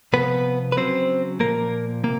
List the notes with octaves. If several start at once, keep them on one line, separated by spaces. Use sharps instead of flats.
C3 F3 B3 B4
B4
C#3 F#3 C4 C5
A#2 F3 A#3 A#4
C3 A#3